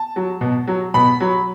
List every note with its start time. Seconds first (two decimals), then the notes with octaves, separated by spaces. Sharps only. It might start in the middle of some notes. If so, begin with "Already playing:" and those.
Already playing: A5
0.16 F#3
0.41 B2
0.68 F#3
0.94 B2 B5
1.21 F#3